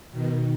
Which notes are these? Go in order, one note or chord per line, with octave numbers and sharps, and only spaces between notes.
B2 D#3